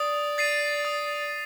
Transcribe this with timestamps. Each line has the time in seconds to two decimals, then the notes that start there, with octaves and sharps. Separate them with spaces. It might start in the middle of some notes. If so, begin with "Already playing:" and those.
Already playing: D5 D#6
0.38 A6 C7 D#7
0.85 D#6